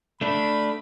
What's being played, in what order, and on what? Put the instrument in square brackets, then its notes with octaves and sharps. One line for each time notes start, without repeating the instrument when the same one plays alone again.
[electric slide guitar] A3 D4 [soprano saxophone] B5